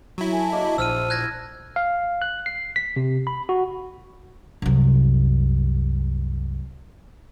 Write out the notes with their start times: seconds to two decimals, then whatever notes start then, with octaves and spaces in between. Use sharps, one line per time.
0.18 F#3 E4 G5
0.32 A4 G#5
0.52 A#3 D4 G#4 D#5
0.78 A#1 E4 C5 F#5 A5 E6 F6 D#7
1.10 F#6 G#6 A#6
1.76 F5
2.22 F#6
2.46 C7
2.76 B6
2.96 C3
3.27 B5
3.49 F#4
4.62 C2 F#2